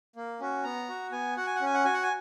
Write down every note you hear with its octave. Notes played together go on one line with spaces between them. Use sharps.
A#3
C#4 F#4
B3 A#5
F#4
B3 G#5
F#4 F#5
G#5
F#5
C#4 G#5
F#5
F#4 G#5
F#5
G#5